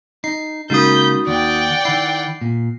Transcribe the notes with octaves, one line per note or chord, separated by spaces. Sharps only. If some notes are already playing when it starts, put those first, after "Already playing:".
D#4 C7
C#3 G#3 A#3 D#4 F#4 B5 D#6 G6
D#2 D5 F#5 G5
D#3 E4 C7
A#2